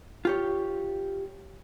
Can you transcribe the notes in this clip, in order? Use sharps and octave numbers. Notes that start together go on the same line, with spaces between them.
F4 G4 C#5